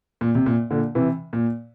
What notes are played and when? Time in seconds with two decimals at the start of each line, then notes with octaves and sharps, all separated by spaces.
0.21 A#2
0.35 C3
0.46 A#2
0.71 A#2 D3
0.95 C3 E3
1.33 A#2